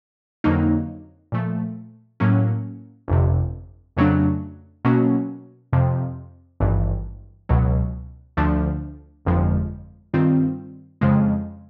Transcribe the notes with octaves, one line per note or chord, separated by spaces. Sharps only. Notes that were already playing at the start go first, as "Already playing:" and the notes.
F2 D3 F#3 A#3 D#4
A#2 F3 A3
A2 F#3 A#3 C#4
G1 F2 C3
F2 C#3 F#3 A3 D4
B2 F#3 A#3 C#4 F#4
F2 C3 F3
G#1 G2 E3
C#2 B2 F#3
D2 D3 F3 A3 D4
G1 F2 D3 F3 G#3
G2 D#3 G3 C4 F4
F2 C#3 F3 G#3